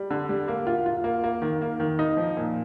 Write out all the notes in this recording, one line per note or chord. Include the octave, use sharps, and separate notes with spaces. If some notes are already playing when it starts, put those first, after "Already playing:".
Already playing: G3
D3
G3
A#3
F4
F4
A#3
A#3
D#3
A#3
D#3
D#4
F3
A#2